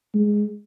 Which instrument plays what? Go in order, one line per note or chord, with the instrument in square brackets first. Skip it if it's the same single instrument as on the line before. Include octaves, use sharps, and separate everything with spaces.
[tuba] G#3